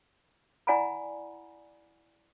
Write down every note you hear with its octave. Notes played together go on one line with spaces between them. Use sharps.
E4 D5 F#5 G#5 A#5 B5